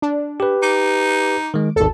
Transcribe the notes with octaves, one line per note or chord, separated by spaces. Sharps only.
D4
G4 B4
D#4 D6
D#3 G#3
G#1 D#2 A4